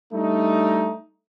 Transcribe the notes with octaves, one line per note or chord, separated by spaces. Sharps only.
G3 A3 D4 D#4